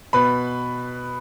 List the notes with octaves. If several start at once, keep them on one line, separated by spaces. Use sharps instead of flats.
B2 B4 B5